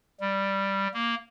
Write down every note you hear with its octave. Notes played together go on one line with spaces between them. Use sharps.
G3
A#3